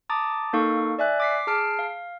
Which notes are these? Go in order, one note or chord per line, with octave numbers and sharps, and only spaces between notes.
A5 A#5 D6 D#6 A6
A#3 D#4 A4 F5 C#6
D5 E5 G#5 F#6
D6 B6 C7
G#4 A5 F6 C7 D7
F5